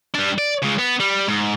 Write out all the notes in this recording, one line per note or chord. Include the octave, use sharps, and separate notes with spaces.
G3 D4
D5
C#3 G#3
B3
G3
G#2